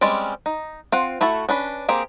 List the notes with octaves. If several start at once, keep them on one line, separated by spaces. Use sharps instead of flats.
G3 G#3 C4 C#4 D5
D#4
C4 F4 F#5
A3 E4 F#4 A4
C#4 D4 B4
A#3 C4 G4 G#4